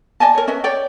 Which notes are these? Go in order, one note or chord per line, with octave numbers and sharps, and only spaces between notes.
D5 D#5 G#5 A5
A#4 C#5
C#4 B4 D#5 E5
C#5 D5 G5